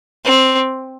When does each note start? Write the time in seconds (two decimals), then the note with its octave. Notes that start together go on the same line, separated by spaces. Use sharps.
0.25 C4